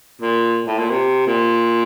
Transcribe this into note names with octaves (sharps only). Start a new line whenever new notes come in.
A#2
A2
A#2
C3
A#2